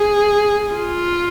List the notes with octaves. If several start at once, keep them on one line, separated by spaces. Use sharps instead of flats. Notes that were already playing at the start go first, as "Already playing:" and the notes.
Already playing: G#4
F4